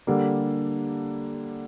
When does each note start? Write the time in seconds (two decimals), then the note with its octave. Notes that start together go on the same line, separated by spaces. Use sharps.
0.07 D3 G3 A#3 D4